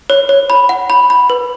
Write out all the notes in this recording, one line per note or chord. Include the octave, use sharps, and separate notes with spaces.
C#5
C#5
B5
F#5
B5
B5
B4